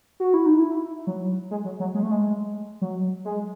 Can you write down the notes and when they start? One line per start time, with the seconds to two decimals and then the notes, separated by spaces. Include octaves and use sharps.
0.20 F#4
0.34 E4
0.46 D#4
0.60 E4
1.07 F#3
1.51 G#3
1.65 F#3
1.80 F#3
1.94 G#3
2.03 A3
2.11 G#3
2.82 F#3
3.25 G#3